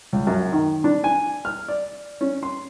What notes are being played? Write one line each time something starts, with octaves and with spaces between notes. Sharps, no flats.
C#2
F#2
D#3
D4
G#5
F6
D5
C#4
C6